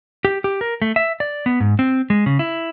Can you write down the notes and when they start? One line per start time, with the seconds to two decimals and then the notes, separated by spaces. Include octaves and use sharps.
0.25 G4
0.44 G4
0.61 A#4
0.82 A3
0.96 E5
1.20 D5
1.46 B3
1.60 G#2
1.79 C4
2.10 G#3
2.26 C#3
2.39 E4